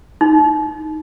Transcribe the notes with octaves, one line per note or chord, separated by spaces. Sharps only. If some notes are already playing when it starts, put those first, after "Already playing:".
D#4